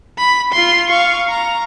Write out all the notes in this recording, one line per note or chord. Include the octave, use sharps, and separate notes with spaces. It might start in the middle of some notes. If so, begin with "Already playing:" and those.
B5
F4 C6
F5 C#6
A#5